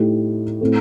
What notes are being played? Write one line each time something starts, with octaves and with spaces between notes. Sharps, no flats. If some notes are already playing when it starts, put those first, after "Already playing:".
Already playing: A2 A3 D#4 G4
A2 A3 C4